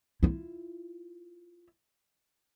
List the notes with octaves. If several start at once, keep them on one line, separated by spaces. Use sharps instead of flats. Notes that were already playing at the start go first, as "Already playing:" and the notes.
E4 F4